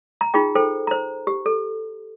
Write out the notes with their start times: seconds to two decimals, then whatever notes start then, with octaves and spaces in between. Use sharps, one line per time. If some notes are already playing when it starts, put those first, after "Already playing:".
0.21 A#5
0.34 D#4 F4 G#4 G5
0.55 A4 C5 G5
0.87 C5 A#5
1.27 G4
1.46 A4